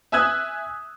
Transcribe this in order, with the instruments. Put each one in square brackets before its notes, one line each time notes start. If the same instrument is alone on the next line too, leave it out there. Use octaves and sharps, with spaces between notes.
[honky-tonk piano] E5 G#5 D#6 E6 F#6 G#6